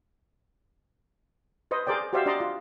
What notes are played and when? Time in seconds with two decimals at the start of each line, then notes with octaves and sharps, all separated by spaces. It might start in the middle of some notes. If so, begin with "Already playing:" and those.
1.71 B4 C5 D#5
1.87 G#4 A#4 C5 D5 G5
2.13 F#4 G4 C5 D5 E5 F5
2.26 D4 D5 D#5 A#5 C6
2.40 F4